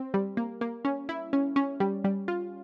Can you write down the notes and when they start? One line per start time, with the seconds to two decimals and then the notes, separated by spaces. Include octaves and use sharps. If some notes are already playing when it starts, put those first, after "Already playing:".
Already playing: C4
0.14 G3
0.37 A#3
0.61 A#3
0.85 C#4
1.09 E4
1.33 C#4
1.56 C#4
1.80 G3
2.04 G3
2.28 F4